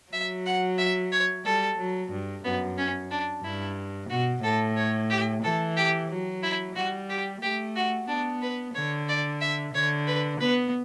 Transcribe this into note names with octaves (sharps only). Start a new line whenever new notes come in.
F#3 E5
F#5
E5
C#5
G3 A4
F#3
G2
F#2 B3
C#4
D4
G2 E4
B2 F#4
A2 A4
C#5
G4
E3 A4
G4
F#3
E4
G3 F#4
G4
A3 G4
F#4
B3 D4
B4
D3 C#5
D5
E5
D3 C#5
B4
B3 B4